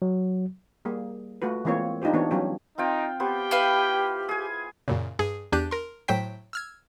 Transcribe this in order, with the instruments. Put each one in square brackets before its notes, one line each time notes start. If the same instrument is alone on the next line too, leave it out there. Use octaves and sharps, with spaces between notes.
[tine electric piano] F#3
[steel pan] G3 A#3 G#4
A3 F4 F#4 B4
E3 G#3 A#3 C4 F4 C#5
D4 D#4 F4 G4 C5
E3 B3 D4 F#4 C#5
F#3 G3 B3 C#4 F4 G4
[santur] C4 F4 G5 [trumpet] D#4
[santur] B3 C5 [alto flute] G4 [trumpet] G5
[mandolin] E4 B4 F5
[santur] G#4 G#5
[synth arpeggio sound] F#2 A#2 C#3
G2 G#4
E2 D4 G4 F#6 G6 D#7
A#4 C6
A2 F#3 C5 G5 B6
E6 F6 G#6